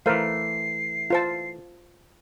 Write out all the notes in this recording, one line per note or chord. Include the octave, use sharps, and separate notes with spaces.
E3 A3 A#4 C5 F5 C7
F4 C5 A5